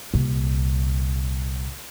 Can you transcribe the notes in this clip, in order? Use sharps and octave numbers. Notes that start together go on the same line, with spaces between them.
C2 A#2